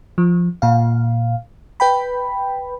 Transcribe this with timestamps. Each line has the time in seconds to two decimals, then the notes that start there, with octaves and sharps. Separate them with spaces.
0.18 F3
0.62 A#2 F5
1.80 B4 G5 B5